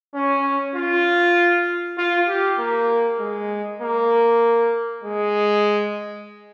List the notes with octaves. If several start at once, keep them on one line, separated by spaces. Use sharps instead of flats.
C#4
F4
F4
G4
A#3
G#3
A#3
G#3